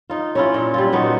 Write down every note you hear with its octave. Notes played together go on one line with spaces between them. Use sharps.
D#4 F4
C#4 E4 F4
A#2
G3 E4 F4
A#2 B3 D#4 F#4